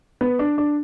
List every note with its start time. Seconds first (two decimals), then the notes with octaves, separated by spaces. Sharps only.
0.21 B3
0.39 D4
0.58 D4